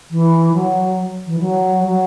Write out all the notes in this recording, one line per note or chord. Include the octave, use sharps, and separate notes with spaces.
E3
F#3
E3
F#3
F#3